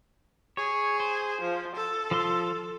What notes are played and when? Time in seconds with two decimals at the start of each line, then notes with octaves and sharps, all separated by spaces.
0.57 G#4 C#5
1.00 C5
1.41 F3
1.76 A4
2.11 F3 F4 C6